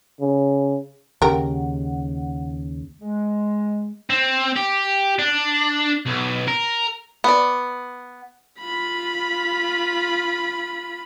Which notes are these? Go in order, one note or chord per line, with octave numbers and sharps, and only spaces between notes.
C#3
D#2 C#3 G4 A#4 F#5
G#3
C4
G4
D4
B1
A#4
B3 D5
F4 B5